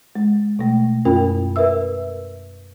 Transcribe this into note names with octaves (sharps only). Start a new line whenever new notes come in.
G#3
B2 A3
F#2 C#4 F4 A#4 G5
A#4 B4 E5 E6